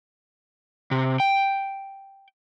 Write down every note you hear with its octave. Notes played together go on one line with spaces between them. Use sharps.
C3
G5